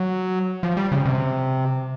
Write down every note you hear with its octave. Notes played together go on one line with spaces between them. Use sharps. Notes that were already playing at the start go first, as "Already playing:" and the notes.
Already playing: F#3
F3
G3
C#3
C3